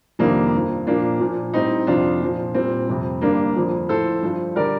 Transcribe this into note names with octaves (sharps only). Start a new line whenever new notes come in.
F2 C3 D#3 G3 A#3 D4
G2 F3
A#2 F3 A#3 D4
A#2 F3
A2 G3 C4 D#4
F2 C3 F3 D4 F4
A#2 F3
A#2 G3 C4
F2 C3 G3
G2 D3 G3 A#3 D4
F2 D3 F3
A2 F3 A4 C5
G2 F3
D3 G3 A#4 D5